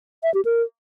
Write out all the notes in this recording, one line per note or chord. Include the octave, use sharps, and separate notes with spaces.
E5
G4
A#4